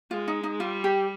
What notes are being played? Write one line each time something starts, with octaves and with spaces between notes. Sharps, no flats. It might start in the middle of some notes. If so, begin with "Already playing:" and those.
G#3 F4
D#4
D#4
G3 F4
G4